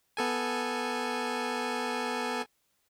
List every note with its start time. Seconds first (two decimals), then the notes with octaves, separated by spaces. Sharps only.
0.17 B3 A4 G#5